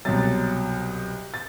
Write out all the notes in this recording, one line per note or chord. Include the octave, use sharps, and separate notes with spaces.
C2 B2 F#3 A6
A6